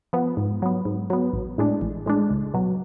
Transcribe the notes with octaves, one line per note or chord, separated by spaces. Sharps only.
F3 B3
G#2
F#3 B3
G#2
F#3 B3
A1
A2 G#3 D4
A1
A2 G#3 D4
C#2
B2 F#3